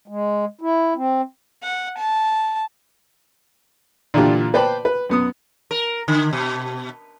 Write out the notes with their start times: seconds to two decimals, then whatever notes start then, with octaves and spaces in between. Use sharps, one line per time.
0.08 G#3
0.61 E4
0.96 C4
1.63 F#5
1.98 A5
4.14 A#2 D3 E3 D4 F4 G4
4.54 B4 C5 D5 G5 A5 B5
4.85 B4
5.10 F#2 B3 D#6
5.71 A#4
6.08 D3
6.33 B2